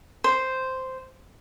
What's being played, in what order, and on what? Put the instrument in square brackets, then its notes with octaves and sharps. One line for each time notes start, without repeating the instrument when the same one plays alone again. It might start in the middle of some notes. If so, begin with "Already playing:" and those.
[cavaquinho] C5